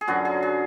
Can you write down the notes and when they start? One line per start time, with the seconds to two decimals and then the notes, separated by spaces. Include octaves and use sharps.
0.01 G#4
0.08 F#2 D3 F#3 F#4
0.25 G#4
0.43 G#4